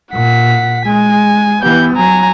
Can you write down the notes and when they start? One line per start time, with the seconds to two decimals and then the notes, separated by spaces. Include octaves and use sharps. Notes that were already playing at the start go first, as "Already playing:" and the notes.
0.13 A#2 F#5 B6
0.86 G#3 G#5
1.63 E3 B3 G4 G6
1.96 F#3 G#5 A#5